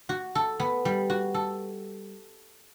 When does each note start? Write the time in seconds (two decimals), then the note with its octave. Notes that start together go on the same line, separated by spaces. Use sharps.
0.09 F#4
0.35 A4
0.60 B3
0.85 G3
1.10 F#4
1.34 A4